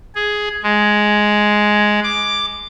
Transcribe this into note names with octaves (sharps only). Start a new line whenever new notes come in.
G#4
G#3
D6